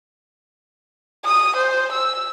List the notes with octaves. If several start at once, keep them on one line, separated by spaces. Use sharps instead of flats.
D#6
C5
E6